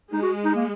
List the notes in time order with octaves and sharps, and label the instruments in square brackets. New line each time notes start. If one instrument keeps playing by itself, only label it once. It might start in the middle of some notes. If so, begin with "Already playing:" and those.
[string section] G#3 [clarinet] D#4
[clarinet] F#4
D#4
A#3